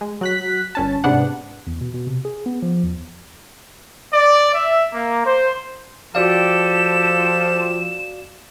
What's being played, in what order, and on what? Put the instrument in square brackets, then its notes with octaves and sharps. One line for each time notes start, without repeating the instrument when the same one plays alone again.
[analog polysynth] G#3
F#3 F#6 B6
G1 C#4 A5
G#2 C3 B3 D4 F#5
[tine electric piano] E2
B2
B2
C3
G#4
B3
F3
E2
[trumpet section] D5
E5
A#3
C5
[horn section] F3 [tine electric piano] F#4 D5 F5 [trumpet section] G4 A4 [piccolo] E7